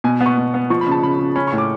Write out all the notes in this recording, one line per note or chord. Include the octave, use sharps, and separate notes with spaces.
B2 G#5
B3
C#6
B2
B3
F3 C#6
B5
C#3 A5
C#3 B5
C#3
C#4 B5
C#6
A2
D6